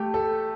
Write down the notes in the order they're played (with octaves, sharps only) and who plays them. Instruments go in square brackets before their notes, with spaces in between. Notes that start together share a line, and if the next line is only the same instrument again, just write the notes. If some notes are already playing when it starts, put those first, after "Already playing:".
Already playing: [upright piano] A3 [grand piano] G4
[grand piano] A4